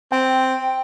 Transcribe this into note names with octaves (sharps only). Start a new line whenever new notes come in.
C4 G5